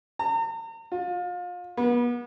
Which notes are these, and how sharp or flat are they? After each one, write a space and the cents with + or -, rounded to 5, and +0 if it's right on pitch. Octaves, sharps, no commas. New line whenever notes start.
A#5 -40
F4 +30
B3 -35